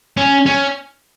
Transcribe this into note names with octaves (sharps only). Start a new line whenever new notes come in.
C#4
C#4